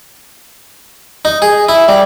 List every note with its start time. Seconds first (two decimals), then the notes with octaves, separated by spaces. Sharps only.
1.25 D#4
1.42 G#4
1.69 E4
1.88 G3